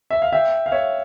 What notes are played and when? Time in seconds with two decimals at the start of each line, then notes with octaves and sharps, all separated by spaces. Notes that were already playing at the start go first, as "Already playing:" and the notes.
0.10 E5
0.22 F5
0.32 E5 G5
0.66 F5
0.72 C#5 E5